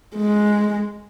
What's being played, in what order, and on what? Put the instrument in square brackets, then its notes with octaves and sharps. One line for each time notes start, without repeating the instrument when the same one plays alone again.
[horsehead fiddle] G#3